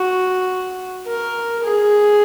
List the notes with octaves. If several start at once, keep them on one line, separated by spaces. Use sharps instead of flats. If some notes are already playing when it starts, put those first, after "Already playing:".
Already playing: F#4
A#4
G#4